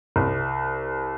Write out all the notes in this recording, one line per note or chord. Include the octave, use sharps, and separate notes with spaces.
C2